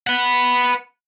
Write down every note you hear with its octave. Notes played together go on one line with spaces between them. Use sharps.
B4 F#5